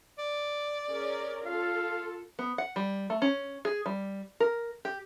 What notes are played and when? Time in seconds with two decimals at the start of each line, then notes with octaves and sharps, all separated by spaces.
0.19 D5
0.87 C#4 G#4 A#4
1.45 F4 A4 F5
2.39 B3
2.58 F#5
2.76 G3
3.10 A3
3.22 C#4
3.65 G#4
3.86 G3
4.40 A#4
4.85 G4